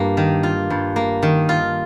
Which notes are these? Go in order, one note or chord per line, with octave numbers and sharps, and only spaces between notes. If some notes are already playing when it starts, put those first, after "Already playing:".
Already playing: G2 A#3 F4
D#3
F4
G2
A#3
D#3
F4